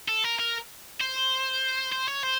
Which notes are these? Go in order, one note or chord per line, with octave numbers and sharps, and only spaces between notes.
A4
A#4
A#4
C5
C5
C#5
C5